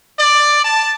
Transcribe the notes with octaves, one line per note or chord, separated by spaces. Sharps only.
D5
A5